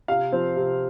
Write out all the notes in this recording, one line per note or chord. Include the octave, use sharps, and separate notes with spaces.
C3 F5
F3 C4
C3